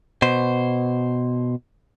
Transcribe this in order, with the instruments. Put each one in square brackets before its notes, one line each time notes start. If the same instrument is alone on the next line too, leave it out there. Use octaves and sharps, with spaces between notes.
[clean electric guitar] B2 C5